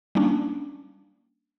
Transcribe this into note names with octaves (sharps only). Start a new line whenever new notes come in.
G3 A#3 C#4 D4